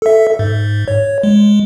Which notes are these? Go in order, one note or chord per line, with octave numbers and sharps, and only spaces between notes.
A4 E5
G#2
C#5
G#3